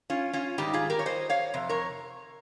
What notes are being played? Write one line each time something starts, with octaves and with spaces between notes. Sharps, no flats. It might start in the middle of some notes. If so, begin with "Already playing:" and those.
C#4 F4
C#4 F4
G#2 D#3 G3 D#4 G4
F4 G#4
G4 A#4
C#5
C5 D#5
C#5 F5
F2 C3
A#4 C#5